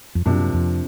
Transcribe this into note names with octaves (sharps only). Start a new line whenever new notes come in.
F2
F#2 C3 F3 A#3 D4
F2